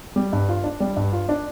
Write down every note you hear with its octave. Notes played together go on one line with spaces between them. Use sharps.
G3
G2
F4
D4
G3
G2
F4
D4